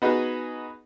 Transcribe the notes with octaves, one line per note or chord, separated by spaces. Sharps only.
B3 D#4 F#4 G#4 B4